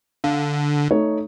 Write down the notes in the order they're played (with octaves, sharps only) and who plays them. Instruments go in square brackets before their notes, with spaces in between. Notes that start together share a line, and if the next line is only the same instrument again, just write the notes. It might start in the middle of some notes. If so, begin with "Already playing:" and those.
[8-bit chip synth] D3 [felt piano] F5
[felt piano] A3 D#4 C#5